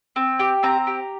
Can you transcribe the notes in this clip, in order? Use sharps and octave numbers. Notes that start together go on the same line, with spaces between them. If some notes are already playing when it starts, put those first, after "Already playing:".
C4
G4
C4 A#5
G4